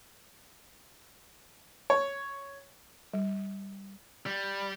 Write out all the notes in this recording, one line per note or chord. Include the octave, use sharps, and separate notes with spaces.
C#5
G3
G3